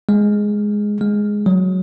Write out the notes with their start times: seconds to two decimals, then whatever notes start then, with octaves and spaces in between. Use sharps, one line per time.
0.09 G#3
1.01 G#3
1.46 F#3